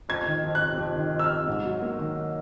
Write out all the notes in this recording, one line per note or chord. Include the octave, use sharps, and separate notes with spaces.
F2 G#6
D#3
F2
F#6
C3
F2
D#3
F2
E6
F6
C3
G#2
F#3
A#3
D#3